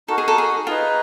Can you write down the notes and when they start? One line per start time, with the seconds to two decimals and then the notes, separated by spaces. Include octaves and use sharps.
0.08 D#4 F#4 A4 A#4
0.18 G#4
0.28 A4
0.38 G#4
0.67 D#4 F4 G#4 B4 D#5